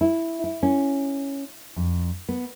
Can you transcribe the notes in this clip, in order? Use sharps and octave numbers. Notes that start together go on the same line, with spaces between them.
E4
E4
C#4
F2
B3